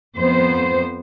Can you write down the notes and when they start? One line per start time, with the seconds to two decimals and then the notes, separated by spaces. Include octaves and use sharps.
0.16 F2 B3 C5